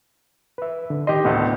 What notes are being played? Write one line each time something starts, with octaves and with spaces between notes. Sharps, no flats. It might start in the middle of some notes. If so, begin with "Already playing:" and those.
B4 E5
D3
D#3 G4 D#5 C6
D2 A2 B3 D4